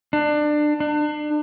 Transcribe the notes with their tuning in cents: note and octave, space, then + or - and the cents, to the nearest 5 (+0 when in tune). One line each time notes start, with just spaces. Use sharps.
D4 +25
D4 +35